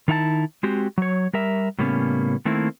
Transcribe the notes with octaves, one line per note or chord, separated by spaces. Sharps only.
D#3 D#4 E4 F5 A5
G#3 C4 F#4 G4
F#3 C#5
G3 A#4 E5
A2 C#3 G3 A#3 B3 C#4
D#3 A3 A#3 C4 E4